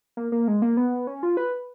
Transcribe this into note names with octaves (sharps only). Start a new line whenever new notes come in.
A#3
A#3
G#3
A#3
B3
C#4
F4
B4